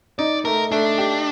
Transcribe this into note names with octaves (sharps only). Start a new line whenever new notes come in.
D#4 D5
A3 A#4
A3 D4
G4